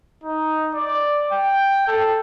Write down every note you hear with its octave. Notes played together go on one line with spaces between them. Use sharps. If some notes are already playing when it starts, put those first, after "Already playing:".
D#4
D5
G5
A4